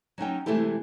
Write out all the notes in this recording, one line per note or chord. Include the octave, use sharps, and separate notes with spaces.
F#3 C#4 D#4 G5
C3 E3 G#3 A3 E4 G4